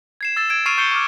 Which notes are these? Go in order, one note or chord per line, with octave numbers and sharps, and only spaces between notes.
G#6 C7 E7
E6 A6 E7
G#6 D7 E7
C#6 F6 C7 D7 D#7 F7
C#6 G6 C7 C#7 G7
C#6 D6 F6